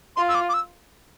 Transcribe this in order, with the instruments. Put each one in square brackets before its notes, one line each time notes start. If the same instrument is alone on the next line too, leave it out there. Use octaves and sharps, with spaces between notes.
[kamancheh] F4 [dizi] C6
[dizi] E6
D6
D6
E6